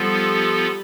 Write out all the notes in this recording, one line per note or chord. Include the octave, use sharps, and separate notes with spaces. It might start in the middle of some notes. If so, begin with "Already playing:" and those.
Already playing: F3 G3 B3 F4 A4